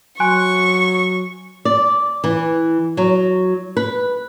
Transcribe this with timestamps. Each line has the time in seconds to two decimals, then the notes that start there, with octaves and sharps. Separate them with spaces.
0.20 F#3 G#5 C6 C#6 F#6
1.65 D5
2.24 E3
2.97 F#3
3.77 B4